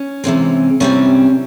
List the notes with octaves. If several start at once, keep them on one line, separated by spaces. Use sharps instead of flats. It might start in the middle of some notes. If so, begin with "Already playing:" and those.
Already playing: C#4
C3 E3 G#3 C4
C3 E3 G3 C4 C#4